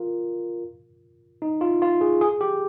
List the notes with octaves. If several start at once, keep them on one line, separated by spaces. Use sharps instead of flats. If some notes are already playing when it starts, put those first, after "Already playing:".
Already playing: F4 A#4
D#4
F4
F4
G#4
G#4
G4